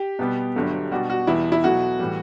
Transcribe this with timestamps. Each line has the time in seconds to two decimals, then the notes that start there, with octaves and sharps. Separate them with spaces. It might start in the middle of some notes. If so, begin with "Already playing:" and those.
Already playing: G4
0.19 B2 G3 B3
0.56 G1 G2 F#3 A3
0.92 B2 G3 D4 F#4
1.10 F#4
1.27 E2 B2 G3 B3 E4
1.52 E4
1.64 B1 B2 F#3 A3 E4 F#4
1.99 A2 E3 G3